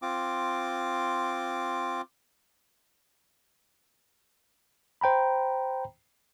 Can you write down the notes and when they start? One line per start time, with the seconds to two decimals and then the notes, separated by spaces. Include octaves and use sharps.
0.02 C4 F4 D6
5.01 C5 G5 A#5 B5